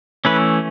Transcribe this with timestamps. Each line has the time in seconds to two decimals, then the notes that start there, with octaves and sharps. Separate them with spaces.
0.25 E3 A3 C#4 B4